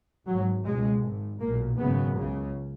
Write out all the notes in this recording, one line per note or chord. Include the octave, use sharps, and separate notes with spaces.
G#1 G#2 F#3
C#2 B2 G#3
G#1 G#2
B1 A#2 A#3
G#1 F#2 C#3 B3
C#2 C#3